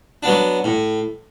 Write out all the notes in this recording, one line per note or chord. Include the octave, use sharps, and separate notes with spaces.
F#3 B3 D4
A2